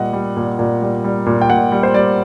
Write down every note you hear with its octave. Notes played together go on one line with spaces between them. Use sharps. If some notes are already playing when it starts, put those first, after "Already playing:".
Already playing: A#2 G3 D#5 F#5
G3
A#2
A#2
G3
G3
A#2
G5
A#2 F#5
G3
C5
G3 D5